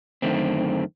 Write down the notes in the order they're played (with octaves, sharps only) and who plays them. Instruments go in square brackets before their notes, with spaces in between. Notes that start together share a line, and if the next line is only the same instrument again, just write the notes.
[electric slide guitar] F#2 D3 D#3 A3 C4